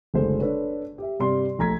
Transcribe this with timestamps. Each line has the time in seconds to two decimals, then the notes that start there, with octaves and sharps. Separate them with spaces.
0.14 F#1 D3 G#3 A3 C5
0.40 D4 A4 B4 C#5
0.98 G4 E5
1.20 G2 C3 G3 D5 C6
1.59 A#1 A3 A#5 G#6 B6